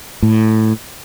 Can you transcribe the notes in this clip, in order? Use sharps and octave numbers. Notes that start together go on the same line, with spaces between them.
A2